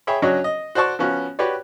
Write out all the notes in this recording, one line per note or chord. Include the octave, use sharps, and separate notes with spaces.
G#4 C#5 E5 G5 B5
F#3 C#4 D4 F#4 C#5 D#5
D#5
F#4 C5 D5 A5 C#6
F3 B3 C#4 F#4
F#4 G4 B4 C#5 D5